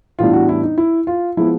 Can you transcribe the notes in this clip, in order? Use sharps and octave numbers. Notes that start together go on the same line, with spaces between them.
A2 E3 G3 B3 D4 F4
F#4
E4
D#4
E4
F4
F3 G#3 B3 E4